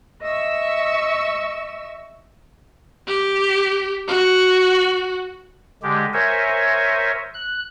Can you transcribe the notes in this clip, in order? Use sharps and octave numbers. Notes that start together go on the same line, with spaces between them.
D#5 E5 C#6 E6
G4
F#4
D3 G#3 G4
A#4 C5 C#5 E5 G#5
F#6